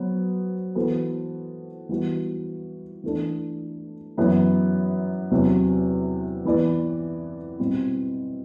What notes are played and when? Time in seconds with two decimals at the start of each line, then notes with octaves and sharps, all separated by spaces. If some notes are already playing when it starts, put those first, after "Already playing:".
Already playing: F#3 B3 F#4 C5
0.75 E3 B3 F#4 A4 C5
1.89 E3 G3 B3 F#4
3.04 E3 A3 D4
4.17 F#2 E3 B3 E4
5.31 E2 C3 F#3
6.45 E3 B3 E4 B4 D5
7.59 B2 G3 C4 E4